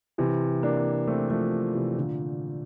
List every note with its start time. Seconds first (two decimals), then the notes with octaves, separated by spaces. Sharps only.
0.18 C3 E3
0.63 A#3 D4
1.07 A3 C4
1.30 F3 A3
1.74 C3 E3
1.97 A#2 D3